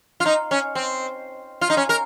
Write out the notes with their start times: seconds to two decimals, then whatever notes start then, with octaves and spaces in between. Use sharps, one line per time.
0.20 F4
0.26 D#4
0.51 C#4
0.75 C4
1.61 F4
1.70 D#4
1.77 C#4
1.89 A#4